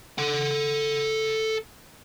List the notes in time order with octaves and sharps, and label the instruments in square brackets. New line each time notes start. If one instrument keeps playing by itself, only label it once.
[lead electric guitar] A4 F#5